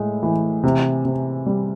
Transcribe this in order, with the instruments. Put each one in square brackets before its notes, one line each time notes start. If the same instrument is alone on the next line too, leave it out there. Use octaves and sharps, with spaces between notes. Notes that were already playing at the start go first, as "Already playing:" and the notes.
Already playing: [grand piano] A2 G#3
E3
C3
C3
G3